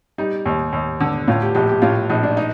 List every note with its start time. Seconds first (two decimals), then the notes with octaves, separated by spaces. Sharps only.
0.18 G3 D#4
0.46 D#2
0.73 D#2
1.00 D3
1.28 A2 F4
1.42 G4
1.55 A#1 G4
1.69 G4
1.82 A2 F4
2.10 A#1 D#4
2.23 D4
2.37 D#4